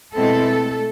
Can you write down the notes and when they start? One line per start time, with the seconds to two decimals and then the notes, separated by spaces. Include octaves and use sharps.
0.14 B2 G#3 A3 C4 E4 A4